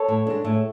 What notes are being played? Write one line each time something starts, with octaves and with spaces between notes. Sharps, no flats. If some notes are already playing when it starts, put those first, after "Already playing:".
Already playing: A4 C#5
A2
G#3 D4
A2